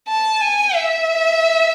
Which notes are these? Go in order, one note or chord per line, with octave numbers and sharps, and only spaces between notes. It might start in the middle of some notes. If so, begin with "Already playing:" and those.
A5
G#5
E5